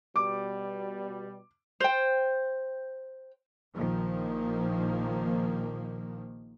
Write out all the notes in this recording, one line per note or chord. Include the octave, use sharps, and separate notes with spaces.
B2 G3 D6
C5 G5
A#1 A#2 D#3 F3 A#3